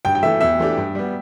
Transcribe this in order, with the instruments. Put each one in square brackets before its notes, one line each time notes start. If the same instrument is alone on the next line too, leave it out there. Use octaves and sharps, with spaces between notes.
[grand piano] G2 [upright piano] G5
[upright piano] G5
[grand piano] E3 A3 [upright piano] E5
[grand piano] E2 [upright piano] E5
[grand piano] E3 A3 D4 G4
G2
G3 B3